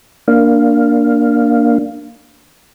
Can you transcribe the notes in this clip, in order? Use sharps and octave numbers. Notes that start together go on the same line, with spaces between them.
A#3 D4 F5